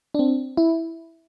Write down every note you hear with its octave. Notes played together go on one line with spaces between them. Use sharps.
D4
C4
E4